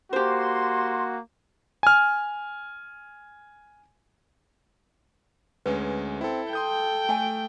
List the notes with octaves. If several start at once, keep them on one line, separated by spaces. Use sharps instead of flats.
A#3 F#4 G4 C5 C6
G#5 F6
D2 G#3 C#4 B4
C4 E4 A4
A4 G5 C6 D#6 G6
A3 G#5 A5